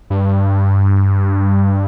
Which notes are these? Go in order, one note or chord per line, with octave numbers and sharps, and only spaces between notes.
G2